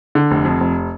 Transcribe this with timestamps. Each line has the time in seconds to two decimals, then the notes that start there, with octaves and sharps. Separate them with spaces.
0.15 D3
0.31 F1
0.45 F2
0.60 F1